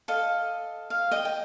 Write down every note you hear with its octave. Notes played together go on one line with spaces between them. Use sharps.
A4 D#5 F5
F5
D#5 G5
G5